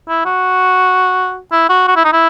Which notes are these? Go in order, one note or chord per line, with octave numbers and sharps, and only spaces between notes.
E4
F#4
E4
F#4
F#4
E4
D#4
E4